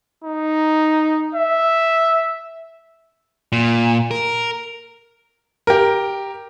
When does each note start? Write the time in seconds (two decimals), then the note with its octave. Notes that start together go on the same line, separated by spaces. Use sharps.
0.24 D#4
1.35 E5
3.52 A#2
4.11 A#4
5.67 G4 A#4